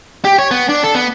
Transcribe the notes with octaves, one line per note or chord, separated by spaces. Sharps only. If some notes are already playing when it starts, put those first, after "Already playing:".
G4
C#5
B3
D4
A4
B3